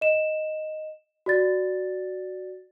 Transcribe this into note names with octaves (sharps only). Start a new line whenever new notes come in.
D#5 E7
F#4 D5 A6